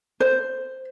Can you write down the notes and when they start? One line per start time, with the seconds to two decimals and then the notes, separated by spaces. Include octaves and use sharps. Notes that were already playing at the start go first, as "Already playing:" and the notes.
0.20 C5